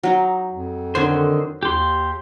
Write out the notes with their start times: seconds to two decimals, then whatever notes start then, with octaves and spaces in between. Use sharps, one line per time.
0.03 F#3 D#4
0.52 F2
0.95 D3 D#3 C5 C#5 F#5
1.63 D#2 G4 C6